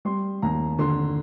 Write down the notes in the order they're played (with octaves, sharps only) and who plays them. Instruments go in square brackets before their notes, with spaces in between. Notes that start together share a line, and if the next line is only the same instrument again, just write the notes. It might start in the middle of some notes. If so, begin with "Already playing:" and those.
[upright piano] G3 C6
D#2 A#5
D3 C6